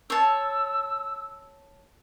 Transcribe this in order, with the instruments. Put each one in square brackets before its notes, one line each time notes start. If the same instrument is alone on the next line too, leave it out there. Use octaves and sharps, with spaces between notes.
[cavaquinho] C#5 A5 [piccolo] E6